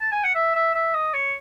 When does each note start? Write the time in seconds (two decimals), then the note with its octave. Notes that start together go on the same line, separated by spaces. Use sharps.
0.01 A5
0.11 G#5
0.24 F#5
0.35 E5
0.55 E5
0.74 E5
0.94 D#5
1.13 C#5